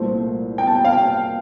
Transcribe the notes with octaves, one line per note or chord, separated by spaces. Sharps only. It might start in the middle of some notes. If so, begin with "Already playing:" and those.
Already playing: C2 A#2 A3 C5
G5
A5
G5
F5
G5